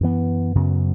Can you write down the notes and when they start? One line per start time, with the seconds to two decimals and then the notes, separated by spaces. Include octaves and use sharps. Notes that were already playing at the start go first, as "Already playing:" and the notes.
0.01 F#2 E3 B3
0.55 F#2 C#3 F#3 B3